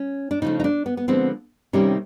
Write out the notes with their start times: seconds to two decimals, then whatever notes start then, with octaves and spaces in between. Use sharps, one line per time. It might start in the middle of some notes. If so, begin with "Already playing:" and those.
Already playing: C#4
0.31 D4
0.42 C#3 F3 A3 D#4
0.60 D#4
0.64 D4
0.86 B3
0.97 B3
1.08 D3 F3 G#3 B3 C4
1.73 C3 D#3 G3 A#3 C#4